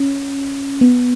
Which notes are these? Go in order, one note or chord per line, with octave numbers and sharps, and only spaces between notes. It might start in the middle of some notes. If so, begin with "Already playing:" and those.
Already playing: C#4
B3